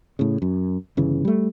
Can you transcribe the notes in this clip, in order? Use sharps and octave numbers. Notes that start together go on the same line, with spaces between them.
A2 C#3
F#2
G1 C#3 E3
G3 A3